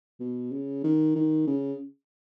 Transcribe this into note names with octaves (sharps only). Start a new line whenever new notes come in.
B2
C#3
D#3
D#3
C#3